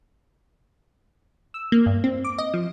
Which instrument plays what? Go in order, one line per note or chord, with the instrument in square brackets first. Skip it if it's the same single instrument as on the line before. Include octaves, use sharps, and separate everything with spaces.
[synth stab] E6
A#3
G2
C4
D6
D#5
F3